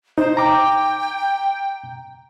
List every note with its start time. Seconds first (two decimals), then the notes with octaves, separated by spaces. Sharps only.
0.18 D#4 C5
0.37 G5 A#5 D6